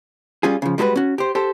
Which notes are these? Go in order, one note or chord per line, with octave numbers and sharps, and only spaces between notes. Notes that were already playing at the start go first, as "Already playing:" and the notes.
G3 C#4 F4 G#4
C#3 F3
G3 G#3 F#4 A4 B4
C#4 F#4
G4 C5
G4 A4 C5